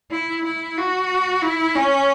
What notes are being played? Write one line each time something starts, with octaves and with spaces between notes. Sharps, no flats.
E4
E4
F#4
E4
C#4